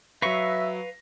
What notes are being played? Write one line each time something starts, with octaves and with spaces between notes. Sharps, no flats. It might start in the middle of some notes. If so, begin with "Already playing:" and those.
F#3 B4 E5 F5 C#6 A#6